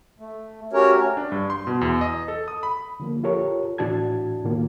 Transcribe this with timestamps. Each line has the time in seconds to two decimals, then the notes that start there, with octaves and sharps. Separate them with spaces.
0.20 A3
0.73 A3 C#4 F#4 G4 A#4 C#5
1.17 D4
1.32 G2
1.50 C6
1.67 B2
1.81 E2
2.01 D#5
2.28 A4
2.48 D#6
2.63 B5
3.00 D3 F3 A#3
3.23 F4 G4 A4 A#4 C#5
3.78 A2 E3 D4 F#4 A5 G#6
4.44 A2 D#3 A#3 F4